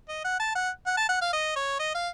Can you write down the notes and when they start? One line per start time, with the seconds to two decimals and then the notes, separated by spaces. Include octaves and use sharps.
0.08 D#5
0.24 F#5
0.40 A5
0.55 F#5
0.86 F#5
0.97 A5
1.09 F#5
1.22 F5
1.33 D#5
1.56 C#5
1.79 D#5
1.95 F5